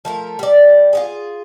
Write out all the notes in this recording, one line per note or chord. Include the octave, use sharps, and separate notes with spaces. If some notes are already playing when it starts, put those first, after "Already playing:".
F3 A3 A#4
G3 D5
F4 G4 G#4